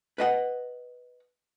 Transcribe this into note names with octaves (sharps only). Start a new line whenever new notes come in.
B4 D#5 F#5